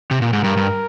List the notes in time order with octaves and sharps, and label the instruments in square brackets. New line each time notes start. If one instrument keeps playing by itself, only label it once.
[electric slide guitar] C3
A#2
G#2
[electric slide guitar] G2 [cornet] A#4
[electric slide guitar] G2